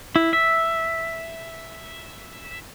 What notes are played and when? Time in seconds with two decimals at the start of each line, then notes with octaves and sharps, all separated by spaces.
0.16 E4
0.33 E5